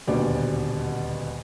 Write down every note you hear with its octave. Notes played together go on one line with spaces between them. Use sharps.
D#1 D2 B2 G4 D5